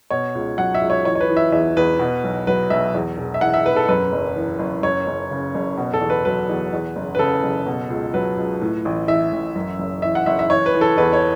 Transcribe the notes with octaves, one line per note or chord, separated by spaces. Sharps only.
B2 C#5
C#2
F#3 F#5
E5
C#2
C#5
E3 C#5
C#5
B4
E3
E5
E2 E5
E2 B4
B2
B1
F#3 B4
B1 E5
E2
E1
E5
E3 F#5
E5
E1 B4
A4
F#2 B4
F#1
E3
F#1
F#2 C#5
F#1
C#3
F#1
B2
A4
E2
B4
F#3 B4
E2
E2
F#1
B4
C#3 A4
F#1
B2
C#2
F#3 B4
C#2
A2
A1
E3 E5
A1
F#2
F#1
E3 E5
F#5
F#1 E5
E5
E3 C#5
B4
E3
A4
E2 B4
C#5